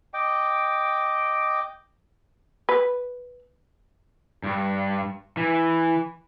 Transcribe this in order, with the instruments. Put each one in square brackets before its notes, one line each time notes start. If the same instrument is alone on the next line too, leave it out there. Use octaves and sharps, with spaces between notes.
[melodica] D#5 G5 D6
[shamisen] B4
[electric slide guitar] G2
E3